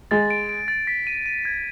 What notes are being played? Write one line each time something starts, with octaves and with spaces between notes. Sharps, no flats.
G#3 A6
D7
D7
A6
B6
D#7
D#7
G#6